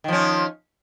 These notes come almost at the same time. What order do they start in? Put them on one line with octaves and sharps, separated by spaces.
D#3 F3 C#4